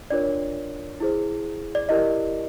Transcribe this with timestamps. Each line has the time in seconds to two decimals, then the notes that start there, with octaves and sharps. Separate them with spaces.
0.10 D4 F4 A#4 C#5 D5
1.00 E4 G#4 C5
1.75 D5
1.89 E4 G4 A#4 D5 D#5